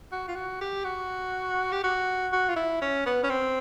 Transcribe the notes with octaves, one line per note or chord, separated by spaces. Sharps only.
F#4
F4
F#4
G4
F#4
G4
F#4
F#4
F4
E4
C#4
B3
C#4
C4